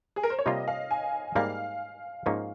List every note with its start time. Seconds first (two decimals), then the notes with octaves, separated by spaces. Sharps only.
0.16 G#4
0.23 A#4
0.30 C5
0.39 C#5
0.46 C3 G3 A#3 F4 D#5
0.68 F5
0.91 G#5
1.35 G#2 G3 A#3 F5
2.26 G#2 F3 A#3 C#4